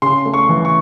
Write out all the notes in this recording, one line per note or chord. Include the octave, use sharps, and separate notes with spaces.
C#3 C6
A3
C#6
E3
C#6